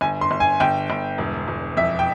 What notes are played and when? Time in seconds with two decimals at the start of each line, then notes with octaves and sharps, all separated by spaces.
0.01 G1 G#5
0.21 C6
0.31 G1
0.40 G#5
0.60 G1 G5
0.90 G1
1.18 E1
1.48 E1
1.77 F2 E5
1.99 G5